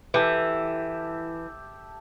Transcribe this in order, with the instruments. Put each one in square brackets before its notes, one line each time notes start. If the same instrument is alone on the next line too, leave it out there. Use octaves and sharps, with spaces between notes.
[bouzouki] E3 [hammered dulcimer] G4 A4 E5